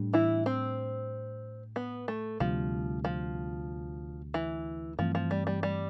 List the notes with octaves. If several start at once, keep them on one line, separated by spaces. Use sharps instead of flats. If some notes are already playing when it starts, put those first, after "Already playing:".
Already playing: A2 G3 D4
E3 E4
C4
B3
A3
D2 C3 F3 G3
F3
E3
G2 E3 F3 A3 C4
F3
G3
G3
G3